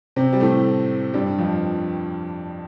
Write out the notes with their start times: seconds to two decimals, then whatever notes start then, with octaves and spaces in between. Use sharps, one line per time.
0.16 C3 C4
0.33 G3
0.40 A2 A3
1.14 G2 G3
1.38 F2 F3